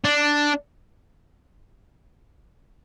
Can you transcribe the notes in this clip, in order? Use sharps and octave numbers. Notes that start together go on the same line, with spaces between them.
D4